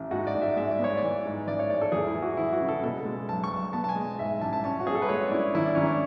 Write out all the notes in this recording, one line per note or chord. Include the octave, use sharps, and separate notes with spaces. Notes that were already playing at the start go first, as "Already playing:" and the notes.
Already playing: A1
G#2 F#4
D5
G#2
E5
G#3 E5
D5
B3
C#5
D5
E3
G#2
A1 D5
C#5
G#2 D5
A4
E2 G#4
E4
E3
F#4
E3 E4
F#4
C#3
A4
B2 A4
G#3
B1 A5
C#6
B1
B3 A5
A5
G#5
G#3
G#2 E5
A1 A5
A5
C#4 A5
F#4
C#4 G#4
A4
B4
G#3 C#5
D4
C#4 E4
G#1 E4
D4
G#1 C#4
D4